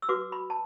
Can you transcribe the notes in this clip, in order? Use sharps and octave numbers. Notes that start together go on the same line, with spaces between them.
E6
F#4 B4 D6
B5
A5